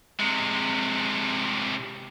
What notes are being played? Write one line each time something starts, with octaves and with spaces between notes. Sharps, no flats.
C3 G#3